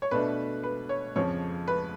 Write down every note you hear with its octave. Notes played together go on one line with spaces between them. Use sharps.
C#5
B2 A3 D4 B4
B4
C#5
F2 C#3 F3 C#5
B4